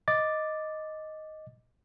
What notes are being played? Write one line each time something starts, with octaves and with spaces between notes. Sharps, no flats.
D#5 D6 A6